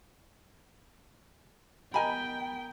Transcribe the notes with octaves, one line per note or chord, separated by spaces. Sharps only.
B3 A#4 D#5 G5 G#5 A#5 B5